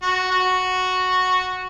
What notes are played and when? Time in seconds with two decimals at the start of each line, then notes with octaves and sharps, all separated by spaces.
0.02 F#4
0.31 F#4